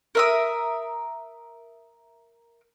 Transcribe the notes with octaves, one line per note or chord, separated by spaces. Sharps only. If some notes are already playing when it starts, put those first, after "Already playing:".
A#4 E5 D#6